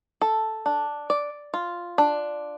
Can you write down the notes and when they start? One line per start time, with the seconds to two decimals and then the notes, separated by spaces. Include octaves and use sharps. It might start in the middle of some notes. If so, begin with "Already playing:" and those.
0.21 A4
0.66 D4
1.10 D5
1.54 F4
1.98 D4